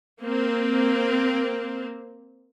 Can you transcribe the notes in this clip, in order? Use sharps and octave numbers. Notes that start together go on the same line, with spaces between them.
A#3 C4